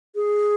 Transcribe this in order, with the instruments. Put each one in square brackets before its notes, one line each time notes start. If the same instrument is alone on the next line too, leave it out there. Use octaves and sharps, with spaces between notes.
[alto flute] G#4